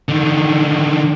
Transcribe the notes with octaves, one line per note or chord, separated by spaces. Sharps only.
D3 D#3